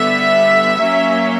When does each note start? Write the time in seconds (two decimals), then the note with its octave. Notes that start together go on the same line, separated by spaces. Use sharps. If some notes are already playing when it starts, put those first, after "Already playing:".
Already playing: D3 G3 B3 E5
0.79 F#3 A#3 C#4